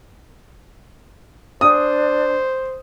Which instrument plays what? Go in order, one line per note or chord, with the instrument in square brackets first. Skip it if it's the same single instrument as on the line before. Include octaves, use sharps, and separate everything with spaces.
[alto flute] D4 [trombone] C5 [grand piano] D#6